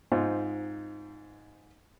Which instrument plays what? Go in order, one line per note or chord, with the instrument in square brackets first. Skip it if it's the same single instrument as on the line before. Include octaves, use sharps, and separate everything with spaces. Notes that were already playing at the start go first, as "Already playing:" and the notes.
[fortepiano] G#2 C4 D#4 F4